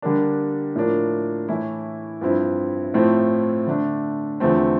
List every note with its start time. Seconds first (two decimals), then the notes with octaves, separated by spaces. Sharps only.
0.02 D3 G3 A#3 D4
0.76 A2 F3 A#3 D4
1.48 A2 E3 A3 E4
2.21 G2 F3 C4 E4
2.94 A2 F3 A3 C4 E4
3.67 D3 A3 D4
4.40 E2 D3 F3 A3 C4